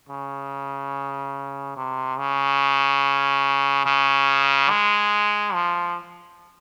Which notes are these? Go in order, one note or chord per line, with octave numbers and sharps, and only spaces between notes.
C#3
C3
C#3
C#3
G#3
F3